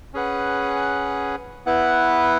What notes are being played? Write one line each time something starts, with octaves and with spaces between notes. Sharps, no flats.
C#4 G#4 B4 F#5
B3 E4 B4 F#5